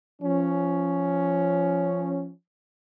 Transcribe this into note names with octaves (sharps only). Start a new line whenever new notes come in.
F3 C#4